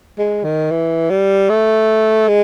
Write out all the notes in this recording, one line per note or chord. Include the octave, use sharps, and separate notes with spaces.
G#3
D#3
E3
G3
A3
G#3